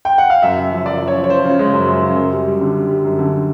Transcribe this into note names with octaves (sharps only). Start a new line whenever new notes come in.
G5
F#5
F5
F#2 E5
C#3
F3
F#2 D5
F3
C#5
F3
C#5
F3 C5
C#3
G#3
F#2
F#2
C#3
F#2
G3
G3
D3
G3
G3
F#2
D3